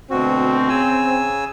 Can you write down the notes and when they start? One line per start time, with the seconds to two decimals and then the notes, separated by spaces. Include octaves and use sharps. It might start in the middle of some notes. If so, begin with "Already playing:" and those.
0.11 D2 B2 C4 F#4
0.69 C#3 G#5 E6